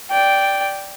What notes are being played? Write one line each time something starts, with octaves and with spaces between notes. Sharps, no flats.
D5 G5